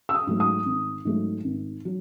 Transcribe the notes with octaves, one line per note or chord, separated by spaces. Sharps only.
E6
D#6
G#2 F#3 A3
D#6
G#1
G#2 F#3 A3
G#1
F#3